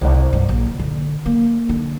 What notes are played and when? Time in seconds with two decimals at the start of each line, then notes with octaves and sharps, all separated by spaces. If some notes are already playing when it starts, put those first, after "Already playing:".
0.01 C2
0.33 G2
0.49 A#1
0.66 D3
0.79 D3
1.26 A#3
1.69 D3